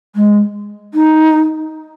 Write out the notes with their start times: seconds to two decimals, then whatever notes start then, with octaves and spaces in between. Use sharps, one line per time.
0.16 G#3
0.94 D#4